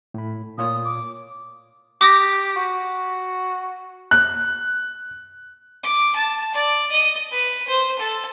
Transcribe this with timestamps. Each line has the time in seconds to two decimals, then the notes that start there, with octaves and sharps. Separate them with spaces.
0.14 A2 B5
0.58 A#2 F4 C#5 D#6
0.85 D6
2.01 G4 D6 D#6 A#6
2.56 F#4
4.11 F#6
5.83 D6
6.15 A5
6.54 D5
6.91 D#5
7.31 B4
7.68 C5
7.99 A4